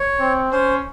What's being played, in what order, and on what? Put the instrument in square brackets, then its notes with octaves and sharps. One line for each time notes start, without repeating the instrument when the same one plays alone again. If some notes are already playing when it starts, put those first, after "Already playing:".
Already playing: [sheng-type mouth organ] C#5
[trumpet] C4
[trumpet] C#4 [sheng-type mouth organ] C5